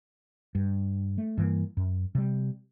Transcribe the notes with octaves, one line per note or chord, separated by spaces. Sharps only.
G2
A3
G2 E3 A#3
F#2
C3 G3